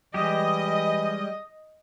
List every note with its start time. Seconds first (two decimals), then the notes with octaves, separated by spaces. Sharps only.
0.14 E3 G3 G#3 G4 D#5